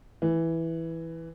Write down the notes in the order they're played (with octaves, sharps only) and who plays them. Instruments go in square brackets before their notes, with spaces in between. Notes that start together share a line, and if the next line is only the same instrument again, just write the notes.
[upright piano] E3